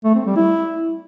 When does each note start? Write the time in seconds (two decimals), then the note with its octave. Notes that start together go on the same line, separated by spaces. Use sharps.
0.05 A3
0.15 C4
0.26 G3
0.36 E4